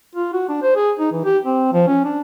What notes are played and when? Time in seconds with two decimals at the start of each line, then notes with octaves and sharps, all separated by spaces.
0.15 F4
0.33 F#4
0.48 D4
0.62 C5
0.76 G#4
1.00 D#4
1.12 E3
1.24 G4
1.45 C4
1.72 F3
1.87 C#4
2.05 D4